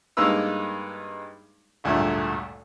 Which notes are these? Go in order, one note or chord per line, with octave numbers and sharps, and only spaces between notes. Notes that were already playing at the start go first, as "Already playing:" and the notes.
G2 G#3 A#3 D#4 B4 E6
G#1 D2 G2 A#2 A3